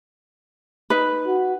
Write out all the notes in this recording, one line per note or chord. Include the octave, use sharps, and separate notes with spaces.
D#4 B4
F#4